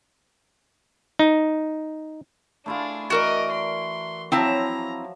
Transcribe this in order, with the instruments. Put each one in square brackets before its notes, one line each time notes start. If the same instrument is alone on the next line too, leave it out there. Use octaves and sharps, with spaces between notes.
[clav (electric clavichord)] D#4
[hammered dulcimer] A3 E4 F4 [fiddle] D4 G#4
[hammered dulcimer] E3 [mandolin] F#4 A#4 D5 [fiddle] D#5
[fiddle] C6
[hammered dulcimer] F3 F#3 [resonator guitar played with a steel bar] C4 E4 A5 [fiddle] A#5